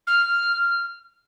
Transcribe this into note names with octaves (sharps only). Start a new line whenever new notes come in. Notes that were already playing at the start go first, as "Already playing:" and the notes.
F6